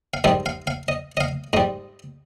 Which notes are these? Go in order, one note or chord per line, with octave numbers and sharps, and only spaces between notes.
F5
G#2 D#3 G3 D#5
F5
F5
D#5
D#5
F5
G#2 G3 D#5